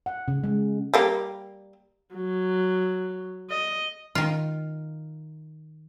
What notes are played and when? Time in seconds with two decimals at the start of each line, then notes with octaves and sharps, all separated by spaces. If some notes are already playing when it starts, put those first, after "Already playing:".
0.06 F#5
0.28 C#3
0.44 G#3
0.94 G3 A#3 G4
2.14 F#3
3.50 D#5
4.15 D#3 F4